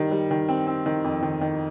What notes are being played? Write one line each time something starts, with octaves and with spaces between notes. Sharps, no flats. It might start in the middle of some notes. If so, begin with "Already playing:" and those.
Already playing: D#3 G3
G3
D#3
C4
C4
D#3
F2
D#3
D#3